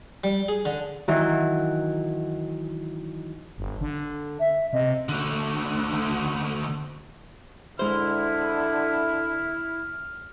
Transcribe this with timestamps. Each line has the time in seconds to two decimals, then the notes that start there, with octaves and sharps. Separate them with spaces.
0.24 G3
0.49 G#4
0.65 D3
1.08 D#3 E3 F#3
3.58 G1
3.81 D3
4.40 E5
4.73 C3 D#5
5.09 D2 D3
7.79 D3 G#3 E4 C5 F6